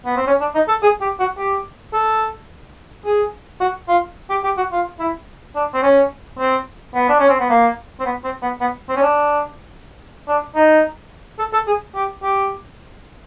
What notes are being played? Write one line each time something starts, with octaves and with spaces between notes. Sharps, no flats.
B3
C4
C#4
D4
D#4
A4
G#4
G4
F#4
G4
A4
G#4
F#4
F4
G4
G4
F#4
F4
E4
D4
C4
C#4
C4
B3
D4
C#4
C4
B3
A#3
C4
B3
C4
B3
B3
C4
C#4
D4
D4
D#4
A4
A4
G#4
G4
G4